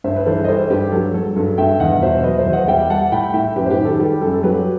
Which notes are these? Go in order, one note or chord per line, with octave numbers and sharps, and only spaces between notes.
G2 C5 E5
B4
E3 A4 C5
D#5
G3 A4 C5
G2 G4 B4
F#3 A4
F#3 A4
G2 A4
G2 E5 G5
E2 D#5 F#5
B2 C5 E5
F#3 B4 D#5
C5 E5
E2
D#5 F#5
G3 E5 G5
G3 F#5 A5
A2 G5 B5
A2 E5 G5
F#2 G4 B4
C5
G4 B4
D#3
A4
G3 G4
F#2 A4
A4
F#3 G4 B4